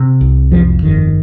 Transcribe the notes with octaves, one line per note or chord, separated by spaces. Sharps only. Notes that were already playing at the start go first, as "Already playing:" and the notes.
Already playing: C3
C2
F2 F3
G1 D#3